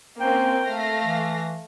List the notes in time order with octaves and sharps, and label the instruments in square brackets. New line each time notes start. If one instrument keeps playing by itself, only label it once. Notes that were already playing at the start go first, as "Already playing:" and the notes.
[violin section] A#3 C4 C#4 [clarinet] G5
[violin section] A3 F5 A#6
[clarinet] E3